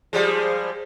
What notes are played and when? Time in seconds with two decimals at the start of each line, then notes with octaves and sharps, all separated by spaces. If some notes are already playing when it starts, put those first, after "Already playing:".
0.13 F3 G3 G#3